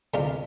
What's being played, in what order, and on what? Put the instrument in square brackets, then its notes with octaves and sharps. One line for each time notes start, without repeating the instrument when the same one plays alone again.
[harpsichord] D2 C3 G#3 D4 F4